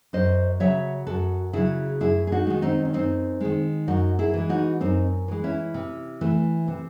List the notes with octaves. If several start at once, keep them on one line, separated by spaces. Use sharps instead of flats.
F#2 C5 D#5
C#3 F#3 C#5 E5
F#2 F#4 A4
C#3 F#3 E4 G#4
F#2 E4 G#4
G#4
D#4 F#4
D#3 G#3
C4 D#4
C#4
F#2 C4 D#4
D#3 G#3
F#2 D#4 F#4
E4 G#4
E3 G#3
D#4 F#4
F#2 C4 D#4
E3 G#3
C#4 E4
C3
E3 A3
C3